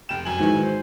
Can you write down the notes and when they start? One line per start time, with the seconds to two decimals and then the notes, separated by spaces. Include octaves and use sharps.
0.09 F1 G5 E7
0.25 F#2 G#5 F#7
0.39 G#2 D#3 E3 F#3
0.63 C5